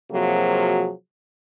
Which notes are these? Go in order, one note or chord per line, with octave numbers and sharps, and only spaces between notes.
C3 F3 F#3 A#3 F#4 G#4